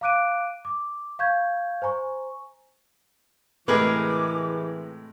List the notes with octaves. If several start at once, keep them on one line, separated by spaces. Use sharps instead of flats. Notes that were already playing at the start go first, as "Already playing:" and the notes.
F5 A#5 D6 F#6 D7 D#7
D6
F5 C#6 G6 G#6
C5 G#5 A#5 C#6
A2 C3 E3 G#3 G#4 A#4 B4 D6